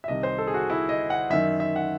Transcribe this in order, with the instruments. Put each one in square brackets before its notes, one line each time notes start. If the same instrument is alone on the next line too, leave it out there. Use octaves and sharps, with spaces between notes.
[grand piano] E5
C2 C3 D#3 D#5
C5
A4
G#4
F#4
E4
D#5
F#5
F#2 D#3 E5
E5
F#5